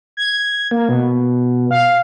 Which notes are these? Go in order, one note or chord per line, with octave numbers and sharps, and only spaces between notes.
G#6
A#3
B2
F5